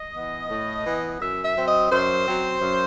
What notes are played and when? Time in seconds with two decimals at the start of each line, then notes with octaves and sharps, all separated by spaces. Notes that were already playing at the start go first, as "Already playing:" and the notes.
Already playing: D#5
0.14 E3 B3
0.49 A2
0.85 E3 B3
1.20 F#2 E5
1.44 E5
1.56 F#3 C4
1.67 D#5
1.90 F#2 C5
2.27 F#3 C4
2.62 F#2